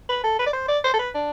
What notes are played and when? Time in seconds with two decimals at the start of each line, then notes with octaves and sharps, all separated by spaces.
0.09 B4
0.24 A4
0.39 B4
0.46 D5
0.53 C5
0.68 D5
0.84 C5
0.94 A4
0.99 B4
1.14 D4